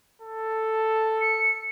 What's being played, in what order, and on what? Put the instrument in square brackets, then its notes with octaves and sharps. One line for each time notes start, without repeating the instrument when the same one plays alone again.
[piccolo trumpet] A4
[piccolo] C#7